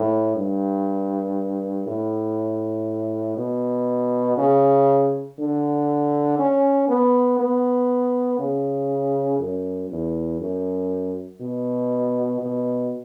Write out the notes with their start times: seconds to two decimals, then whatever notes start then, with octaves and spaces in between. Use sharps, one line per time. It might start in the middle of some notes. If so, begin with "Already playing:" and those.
Already playing: A2
0.36 G2
1.87 A2
3.37 B2
4.38 C#3
5.39 D3
6.39 C#4
6.88 B3
7.39 B3
8.39 C#3
9.39 F#2
9.90 E2
10.40 F#2
11.40 B2
12.41 B2